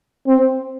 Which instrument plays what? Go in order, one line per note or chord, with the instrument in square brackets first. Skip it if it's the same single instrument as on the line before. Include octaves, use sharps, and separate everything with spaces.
[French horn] C4